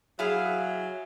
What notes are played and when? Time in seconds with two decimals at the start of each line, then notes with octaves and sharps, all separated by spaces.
0.19 F#3 E4 G#4 F5